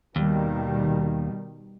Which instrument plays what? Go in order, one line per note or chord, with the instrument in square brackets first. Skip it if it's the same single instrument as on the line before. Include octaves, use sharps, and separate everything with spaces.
[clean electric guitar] D#2 [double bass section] B2 D#3 G3